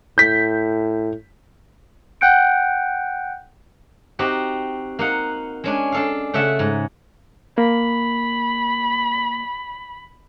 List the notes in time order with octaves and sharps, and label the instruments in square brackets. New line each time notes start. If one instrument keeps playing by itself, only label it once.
[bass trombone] A2 [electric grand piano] G6 B6
[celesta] F#5 G5 F#6 G6 C#7 D7
[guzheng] C4 D#4 F#4 G4
A#3 D#4 F#5
G#3 C#4 D4
D4 A4 F5
C#3 A3 A4 E5 F#5
G#2
[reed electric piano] A#3 [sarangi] B5